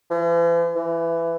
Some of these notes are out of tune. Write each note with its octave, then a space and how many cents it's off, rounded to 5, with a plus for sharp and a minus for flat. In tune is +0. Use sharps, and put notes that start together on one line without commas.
E3 +45
E3 +20